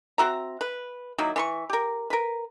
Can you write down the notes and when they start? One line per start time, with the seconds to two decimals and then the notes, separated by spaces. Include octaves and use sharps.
0.18 C4 F#4 E5 A#5
0.61 B4
1.18 D#3 F#3 A#3 E4
1.36 E3 C6 C#6
1.70 G4 A#4
2.10 A#4 B4